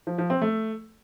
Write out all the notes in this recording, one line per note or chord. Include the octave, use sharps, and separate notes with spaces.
F3
F3
C4
A3